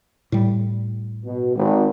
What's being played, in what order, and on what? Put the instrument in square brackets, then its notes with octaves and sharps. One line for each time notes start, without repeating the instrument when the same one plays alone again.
[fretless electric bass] A2 G3
[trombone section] B2
G#1